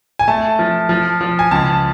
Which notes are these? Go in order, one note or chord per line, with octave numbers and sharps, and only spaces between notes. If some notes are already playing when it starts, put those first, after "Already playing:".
G#5
A3 A5
F3
F3
F3
G#5
C#2 A5